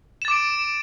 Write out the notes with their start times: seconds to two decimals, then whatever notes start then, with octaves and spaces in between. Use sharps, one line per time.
0.22 E7
0.25 A6
0.28 D6
0.31 D7